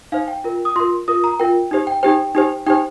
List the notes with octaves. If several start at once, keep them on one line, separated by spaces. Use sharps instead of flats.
D#4 C5 F5
G5
F4 A#4
D#6
F4 A#4 C6
F4 A#4 D#6
A#5
F4 A#4 G5
D#4 G4 C5
G5
D#4 G4 C5 G5
D#4 G4 C5
D#4 G4 C5 G5